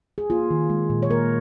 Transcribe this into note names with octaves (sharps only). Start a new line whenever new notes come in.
G#4
A#3 F4
D#3
G#3
A#2
C#5
A#3 A#4